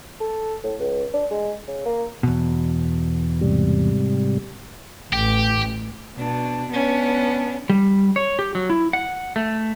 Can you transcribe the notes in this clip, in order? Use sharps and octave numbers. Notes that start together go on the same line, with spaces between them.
A4
A2
C#2
D4
G#3
C#3
A#3
E2 B2
G#2 C3 G3
A1 G4
B2 D4
B3 C#4 D4
G3
C#5
G4
F#3
E4
F#5
A3